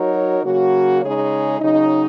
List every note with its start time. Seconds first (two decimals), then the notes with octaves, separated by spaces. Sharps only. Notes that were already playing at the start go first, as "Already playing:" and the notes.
Already playing: F#3 D#4 F#4 A#4 C#5
0.44 C#3 F#3 A#3 F#4
1.03 C#3 G#3 D#4 G#4 C#5
1.60 C#3 F#3 D#4